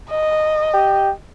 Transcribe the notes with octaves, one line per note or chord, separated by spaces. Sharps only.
D#5
G4